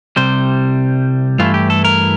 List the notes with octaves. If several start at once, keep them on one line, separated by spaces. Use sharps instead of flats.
C2 C3 G3 C5
G2 E3 A3 E4 F4
G4
A4
A#4